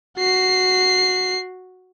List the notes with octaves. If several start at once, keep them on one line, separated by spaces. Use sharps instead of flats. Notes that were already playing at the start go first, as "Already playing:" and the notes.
F#4 C7